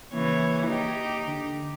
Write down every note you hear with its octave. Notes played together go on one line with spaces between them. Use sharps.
C#3 E3 A#3 C#5
D#4 G4
D3